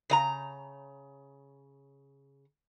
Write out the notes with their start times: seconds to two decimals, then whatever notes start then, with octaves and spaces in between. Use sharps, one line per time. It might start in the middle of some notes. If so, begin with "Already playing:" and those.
0.10 C#3 D#5 A#5